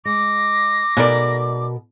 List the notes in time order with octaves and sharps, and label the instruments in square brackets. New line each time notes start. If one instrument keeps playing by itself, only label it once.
[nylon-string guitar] G#3 [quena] D6 [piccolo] A#6
[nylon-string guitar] B2 A4 A#4 [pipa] G#3 D#4 D5